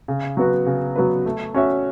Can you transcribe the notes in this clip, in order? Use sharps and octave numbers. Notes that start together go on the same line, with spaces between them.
C#3
F#3 B3 F#4 B4
C#3
F#3 B3 F#4 B4
A3
C#4 F#4 C#5 E5